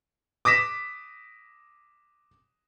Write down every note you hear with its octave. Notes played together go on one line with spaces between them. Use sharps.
D6 D#6 A#6 B6 E7